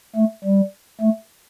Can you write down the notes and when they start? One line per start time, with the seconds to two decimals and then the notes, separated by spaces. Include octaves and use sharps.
0.16 A3
0.44 G3
1.01 A3